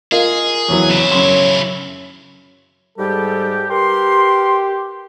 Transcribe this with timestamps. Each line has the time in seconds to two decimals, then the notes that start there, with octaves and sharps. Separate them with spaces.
0.12 F4 G#4 A#4 D#5 F5
0.68 E2 E3 F#3 C#5
0.90 C#3 E4
1.11 F#2 B5 C6
2.98 G#2 G3 G4 A4
3.70 G4 A#4 B4 C6